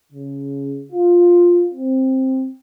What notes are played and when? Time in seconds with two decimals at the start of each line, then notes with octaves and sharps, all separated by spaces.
0.12 C#3
0.93 F4
1.74 C4